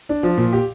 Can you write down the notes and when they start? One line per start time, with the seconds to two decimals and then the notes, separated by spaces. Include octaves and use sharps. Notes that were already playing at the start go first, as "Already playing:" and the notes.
0.09 D4
0.23 F3
0.38 A#2
0.53 G4